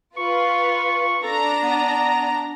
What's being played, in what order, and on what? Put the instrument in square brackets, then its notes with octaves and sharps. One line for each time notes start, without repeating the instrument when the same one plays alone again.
[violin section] F4 B4 [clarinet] C#6
[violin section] D4 A#5 [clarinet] A4
[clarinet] B3